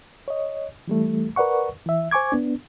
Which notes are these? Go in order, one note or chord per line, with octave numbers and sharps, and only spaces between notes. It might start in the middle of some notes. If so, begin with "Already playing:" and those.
C#5 D#5
E3 G3 A3
A#4 B4 D5 F#5 C#6
E3 E5
C5 G#5 C#6 D6 G#6
B3 D4